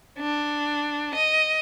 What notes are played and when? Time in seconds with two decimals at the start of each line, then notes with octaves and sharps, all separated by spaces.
0.19 D4
1.14 D#5